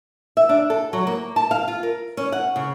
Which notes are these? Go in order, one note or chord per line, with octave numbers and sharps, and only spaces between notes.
E5
D4
A4
F#3
A#3
A5
F5
F4
A#4
C#4
F#5
C#3